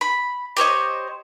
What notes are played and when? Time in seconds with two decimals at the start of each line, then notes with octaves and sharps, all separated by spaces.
0.01 B5
0.57 G4 C5 C#5 D#5